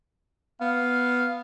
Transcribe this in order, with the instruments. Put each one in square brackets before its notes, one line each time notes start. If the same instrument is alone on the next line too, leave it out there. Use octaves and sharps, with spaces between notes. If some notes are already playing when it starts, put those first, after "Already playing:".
[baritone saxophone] B3 [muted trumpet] F5